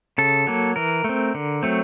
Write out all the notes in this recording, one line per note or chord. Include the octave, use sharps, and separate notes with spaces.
C#3 A4
F#3 A#3
E3 A#4
A3 C4
D3
F#3 A3 C4